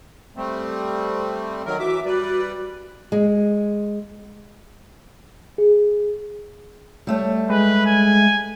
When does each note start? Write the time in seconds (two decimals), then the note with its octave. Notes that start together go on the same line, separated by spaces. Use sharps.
0.36 G3 A3 C4
1.66 D#3 F#3 A#4
1.79 E3 F#4 E5 D6
2.05 G3 B4 D5
3.12 G#3
5.58 G#4
7.07 G3 A3 C#5
7.50 G#3 B4
7.86 G#5